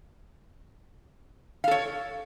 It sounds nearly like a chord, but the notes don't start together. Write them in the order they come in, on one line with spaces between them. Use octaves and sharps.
F5 A4 C#5